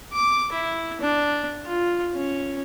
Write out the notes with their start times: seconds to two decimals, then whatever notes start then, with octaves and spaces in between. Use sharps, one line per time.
0.13 D6
0.52 E4
1.01 D4
1.66 F4
2.15 C#4